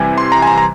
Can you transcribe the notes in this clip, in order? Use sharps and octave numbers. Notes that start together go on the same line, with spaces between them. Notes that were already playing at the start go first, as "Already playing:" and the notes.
Already playing: C3 E3 G3 G#5
C6
A#5
G#5
A#5
A#5